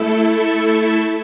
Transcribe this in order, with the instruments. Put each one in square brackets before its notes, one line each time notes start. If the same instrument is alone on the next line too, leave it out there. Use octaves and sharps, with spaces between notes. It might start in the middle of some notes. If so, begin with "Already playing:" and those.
Already playing: [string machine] A3 E4 A4 E5